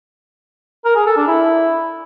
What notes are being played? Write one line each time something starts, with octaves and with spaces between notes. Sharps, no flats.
A#4
G#4
A4
D4
E4